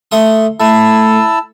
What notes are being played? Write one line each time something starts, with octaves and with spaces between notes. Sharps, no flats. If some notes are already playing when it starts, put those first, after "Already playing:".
A3 C6 D#6
A3 E4 A5 E6